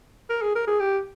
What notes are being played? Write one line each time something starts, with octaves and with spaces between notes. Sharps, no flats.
A#4
G#4
A#4
G#4
G4